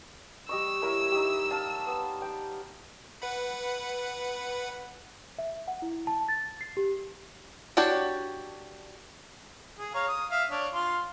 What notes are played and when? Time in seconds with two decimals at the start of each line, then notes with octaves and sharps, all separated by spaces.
0.49 G3 D#5 C#6 E6
0.82 E4 A#4 C#5
1.12 D#4 G4
1.51 F5 A5
1.86 B3
2.22 G5
3.22 B4 F#5 B5
5.39 E5
5.68 F#5
5.82 E4
6.07 A5
6.29 A6
6.61 C7
6.77 G4
7.77 D4 F#4 G4 C#5 D5
9.79 G#4
9.94 C#5 F5 A#5
10.08 D#6
10.31 E5 F5
10.51 D4 C#5
10.74 F4 F5 C6